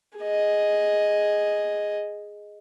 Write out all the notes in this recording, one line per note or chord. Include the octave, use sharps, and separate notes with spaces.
G#4 D#5